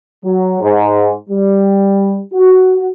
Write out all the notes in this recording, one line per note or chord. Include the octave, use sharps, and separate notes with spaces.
F#3
G#2
G3
F#4